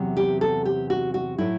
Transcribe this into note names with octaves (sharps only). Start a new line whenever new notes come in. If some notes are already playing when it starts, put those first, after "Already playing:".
Already playing: E2 C3 F#3
G4
A4
G4
F#4
F#4
A2 F#3 A3 E4